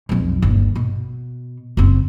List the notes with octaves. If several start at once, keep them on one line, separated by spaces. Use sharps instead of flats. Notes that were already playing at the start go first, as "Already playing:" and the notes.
B1 F2
G1 D#2
B2
F#1 C4